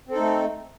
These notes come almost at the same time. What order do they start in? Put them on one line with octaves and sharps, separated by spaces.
C4 A4 D#4 A3